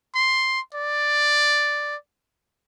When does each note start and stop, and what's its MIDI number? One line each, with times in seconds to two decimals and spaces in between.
0.15 0.60 84
0.74 1.96 74